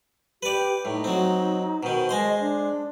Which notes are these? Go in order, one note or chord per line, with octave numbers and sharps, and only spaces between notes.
G4 B4 D5
A2 D#4
F#3 C4
B2 D#3 C5
G#3 C5 D#5 C6
D4